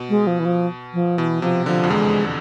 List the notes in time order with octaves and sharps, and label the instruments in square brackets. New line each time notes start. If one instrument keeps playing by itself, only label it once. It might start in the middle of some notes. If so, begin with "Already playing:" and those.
Already playing: [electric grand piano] B2
[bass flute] G#3
F3
E3
F3
F3
[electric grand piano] B2 [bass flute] E3
[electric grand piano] C3 [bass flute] F3
[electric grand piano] D3 [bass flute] F3
[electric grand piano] F2
[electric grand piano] E2 [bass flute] G#3